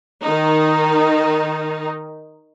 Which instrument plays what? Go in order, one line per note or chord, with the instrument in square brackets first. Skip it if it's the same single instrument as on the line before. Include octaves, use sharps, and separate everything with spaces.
[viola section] D#3 D#4